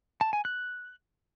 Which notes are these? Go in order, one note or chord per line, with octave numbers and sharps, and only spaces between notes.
A5
G#5
F#6